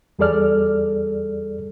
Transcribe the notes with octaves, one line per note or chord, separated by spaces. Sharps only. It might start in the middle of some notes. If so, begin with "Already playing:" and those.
E2 G3 G#4 A4 D5 F6